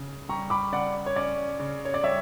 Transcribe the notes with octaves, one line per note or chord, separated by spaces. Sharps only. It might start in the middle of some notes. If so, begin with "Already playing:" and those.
Already playing: C#3 C#4
G3 A#5 C#6
B5 D6
C#3 D5 F#5
C#5
C#4 D5
C#3
C#5
D5
G3 C#5 E5